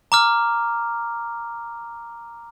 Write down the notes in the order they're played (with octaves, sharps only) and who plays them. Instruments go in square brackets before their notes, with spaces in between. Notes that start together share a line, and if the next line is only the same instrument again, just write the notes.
[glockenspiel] A#5 D6 F6